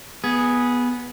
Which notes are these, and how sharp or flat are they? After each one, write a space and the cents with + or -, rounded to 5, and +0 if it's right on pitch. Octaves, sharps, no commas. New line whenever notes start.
B3 -10 G#4 +0